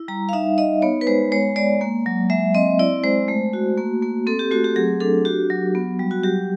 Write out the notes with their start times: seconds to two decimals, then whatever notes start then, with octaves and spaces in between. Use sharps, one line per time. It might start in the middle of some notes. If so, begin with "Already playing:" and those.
Already playing: E4
0.08 G3 A#5
0.29 F5
0.33 D#4 E5
0.58 D#4 D#5
0.82 B3 C#5
1.01 B4
1.07 G#3 C5
1.32 G#3 C#5
1.56 G#3 D5
1.81 A#3
2.06 F#3
2.30 G#3 E5
2.55 C4 D#5
2.79 E4 D5
3.04 G#3 C5
3.28 A3
3.53 F#4
3.78 A#3
4.03 A#3
4.27 C4 A4
4.39 G4
4.51 A3 F#4
4.64 G4
4.76 F#3 G#4
5.00 D4 A4
5.25 F#4 G4
5.50 F#3
5.75 B3
5.99 G3
6.11 F#4
6.24 F#3 G4